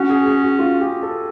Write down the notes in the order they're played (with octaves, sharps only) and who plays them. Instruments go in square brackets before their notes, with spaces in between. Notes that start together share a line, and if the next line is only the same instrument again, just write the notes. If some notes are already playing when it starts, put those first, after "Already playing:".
Already playing: [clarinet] C#4 [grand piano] F#4
[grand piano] G#4
G#4
F#4
F4
G4
A4